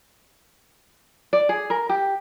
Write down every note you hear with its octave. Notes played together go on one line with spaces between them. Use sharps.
D5
G#4
A#4
G4